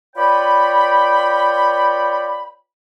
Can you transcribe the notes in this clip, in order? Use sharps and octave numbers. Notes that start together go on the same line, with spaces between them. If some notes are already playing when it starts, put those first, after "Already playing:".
F4 B4 C#5 D5 G5 B5